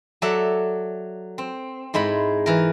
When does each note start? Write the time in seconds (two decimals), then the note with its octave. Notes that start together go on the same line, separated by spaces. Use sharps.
0.22 F#3 A4 D5 E5 F#5
1.38 C4
1.94 G#2 G#3 E4 B5
2.46 E3 A#4